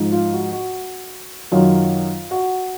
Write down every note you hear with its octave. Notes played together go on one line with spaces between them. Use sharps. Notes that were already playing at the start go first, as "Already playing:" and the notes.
Already playing: G#2 F3
F4
F#4
F#4
F#2 D#3 F#3 F4
F#4